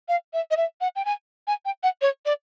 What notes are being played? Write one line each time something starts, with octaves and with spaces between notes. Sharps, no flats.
F5
E5
D#5
E5
F#5
G5
G#5
G#5
G5
F#5
C#5
D5